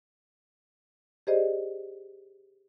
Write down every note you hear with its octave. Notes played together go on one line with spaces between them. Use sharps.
G4 G#4 C5 D5 D#5